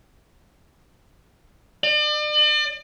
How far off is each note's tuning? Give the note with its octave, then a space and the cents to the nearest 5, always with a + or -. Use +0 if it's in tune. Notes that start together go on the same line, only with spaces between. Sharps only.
D5 +40